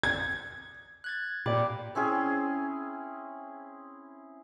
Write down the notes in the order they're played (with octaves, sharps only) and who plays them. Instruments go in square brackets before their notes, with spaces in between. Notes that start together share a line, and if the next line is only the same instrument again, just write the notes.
[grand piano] G#6
[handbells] F#6 G#6 A6
[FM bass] A#2 [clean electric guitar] F4 G4 D5 [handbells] G5 B5 D6
[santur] C4 C#4 E4 G#4